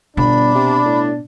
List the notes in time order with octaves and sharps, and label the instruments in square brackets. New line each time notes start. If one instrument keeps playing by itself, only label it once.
[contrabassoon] G1 [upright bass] B2 [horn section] D4 [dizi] B5
[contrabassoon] C3
A2